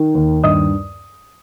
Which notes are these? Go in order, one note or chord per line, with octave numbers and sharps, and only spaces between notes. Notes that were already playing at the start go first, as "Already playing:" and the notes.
Already playing: D#3
D#2
G2 D#5 D#6